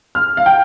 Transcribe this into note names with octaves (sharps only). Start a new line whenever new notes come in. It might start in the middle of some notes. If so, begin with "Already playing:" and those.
F6
F5
G5